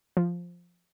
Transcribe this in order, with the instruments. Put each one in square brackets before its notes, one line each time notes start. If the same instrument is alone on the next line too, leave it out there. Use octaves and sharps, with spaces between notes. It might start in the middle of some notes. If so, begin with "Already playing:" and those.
[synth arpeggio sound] F3